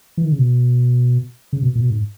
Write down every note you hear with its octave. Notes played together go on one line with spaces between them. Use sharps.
E3
D#3
C#3
B2
C#3
B2
A#2
B2
G#2